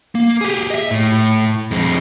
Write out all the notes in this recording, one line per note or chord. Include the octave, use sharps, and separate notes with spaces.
A#3
G4 G#4
D#5 E5
A2
F2 G#3